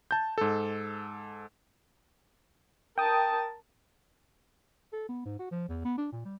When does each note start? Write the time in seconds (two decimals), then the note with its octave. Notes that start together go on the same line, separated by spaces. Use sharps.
0.11 A5 G6
0.38 G#2 A4
2.98 A#4 G5 A5 D#6
4.93 A4
5.09 B3
5.25 G#2
5.39 F#4
5.51 F3
5.69 E2
5.85 B3
5.98 D4
6.12 A#2
6.25 G3